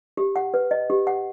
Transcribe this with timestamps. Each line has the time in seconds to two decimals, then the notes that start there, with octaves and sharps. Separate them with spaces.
0.17 G4
0.36 F#5
0.54 B4
0.71 D#5
0.90 G4
1.07 F#5